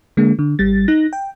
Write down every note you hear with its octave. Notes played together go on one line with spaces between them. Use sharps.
D3 G#3 A#3
D3
G#1 G3 A6
D#4 F#6 A#6
G5